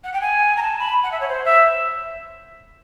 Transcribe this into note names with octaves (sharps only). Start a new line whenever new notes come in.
F#5
G5
G#5
A#5
A5
B5
F#5
E5
C#5
C5
E5